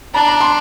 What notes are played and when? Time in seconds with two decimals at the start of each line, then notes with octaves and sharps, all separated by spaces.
0.14 D4 A#5
0.28 A#5
0.40 C6